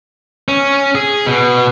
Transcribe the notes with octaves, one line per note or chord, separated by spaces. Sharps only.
C#4
G#4
B2